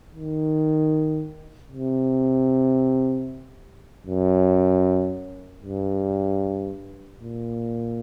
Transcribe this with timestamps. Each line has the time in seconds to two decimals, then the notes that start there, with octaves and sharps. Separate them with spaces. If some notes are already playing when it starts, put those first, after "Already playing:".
0.15 D#3
1.72 C3
4.07 F#2
5.63 G2
7.20 A#2